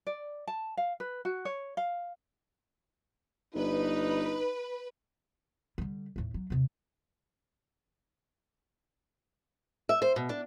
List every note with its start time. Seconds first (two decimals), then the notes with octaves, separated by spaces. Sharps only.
0.07 D5
0.48 A5
0.77 F5
1.00 B4
1.25 F#4
1.45 C#5
1.77 F5
3.55 G1 D#4 B4
5.78 D3 G3
6.16 D#2 A2
6.34 F#3
6.50 D#2 C3
9.89 E5
10.02 C5
10.16 B2
10.29 D4